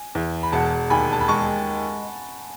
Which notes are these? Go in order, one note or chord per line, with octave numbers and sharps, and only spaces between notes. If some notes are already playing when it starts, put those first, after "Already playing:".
Already playing: G#5
E2
B5
E1 F#5 A5
D#2 G#5 B5
A5
B5
G#3 A5 C#6